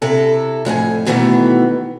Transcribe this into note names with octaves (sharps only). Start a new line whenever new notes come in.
C3 E4 A4
F2 A2 G#4 G#5
B2 D#3 E3 A3 B3